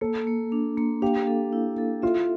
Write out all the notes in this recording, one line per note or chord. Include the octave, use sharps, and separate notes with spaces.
A#3 A4
A#3
D4
A#3
G4 F5
A4
E4
A4
F4 E5